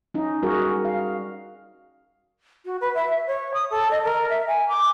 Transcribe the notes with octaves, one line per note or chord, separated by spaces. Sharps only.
C#4 D#4
G3 F#4 G#4 A#4
F5
F#4
B4
E5
C#5
D#6
A4
D#5
A#4
E5
G#5
D6